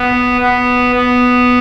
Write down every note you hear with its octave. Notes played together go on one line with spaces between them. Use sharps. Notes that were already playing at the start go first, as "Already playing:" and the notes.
Already playing: B3
B3
B3